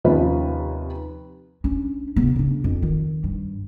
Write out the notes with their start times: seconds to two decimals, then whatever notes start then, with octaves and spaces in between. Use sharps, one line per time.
0.04 D#2 C3 F3 C#4 F4 B4
1.64 C#4 D4
2.16 C3 B3
2.36 C#3 D4
2.64 F2
2.82 D#3 F4
3.24 G2